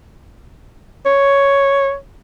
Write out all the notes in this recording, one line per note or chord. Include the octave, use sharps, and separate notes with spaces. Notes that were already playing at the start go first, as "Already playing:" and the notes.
C#5